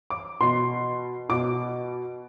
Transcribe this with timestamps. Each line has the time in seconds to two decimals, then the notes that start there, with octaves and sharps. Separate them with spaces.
0.10 D6
0.40 B2 C6
1.29 B2 D6